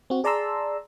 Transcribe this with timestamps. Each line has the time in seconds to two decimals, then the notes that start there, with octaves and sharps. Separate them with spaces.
0.10 C4 F#4
0.24 G#4 D5 A5 A#5 C6 E6